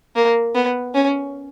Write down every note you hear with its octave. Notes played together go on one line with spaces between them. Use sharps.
A#3
B3
C#4